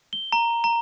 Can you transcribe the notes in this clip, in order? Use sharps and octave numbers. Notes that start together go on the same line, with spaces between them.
G7
A#5
A#5